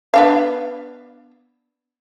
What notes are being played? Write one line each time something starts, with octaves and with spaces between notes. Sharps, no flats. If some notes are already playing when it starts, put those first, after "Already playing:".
B3 D4 F5